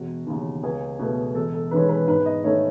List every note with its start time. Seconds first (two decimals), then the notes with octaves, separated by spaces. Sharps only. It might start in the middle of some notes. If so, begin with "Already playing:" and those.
Already playing: E1 F#4
0.26 D#2 C#3
0.63 C#2 G#4
0.99 B2 A3
1.35 E1 A4
1.54 A4
1.71 E2 D#3 G#3 C#4 B4
1.89 B4
2.07 G#2 B4
2.25 D#5
2.44 D#3 A3 C#4 C#5